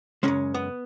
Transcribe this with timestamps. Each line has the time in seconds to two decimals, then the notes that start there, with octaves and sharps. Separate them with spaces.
0.23 F#2 C#3 G#3 C#4
0.54 B3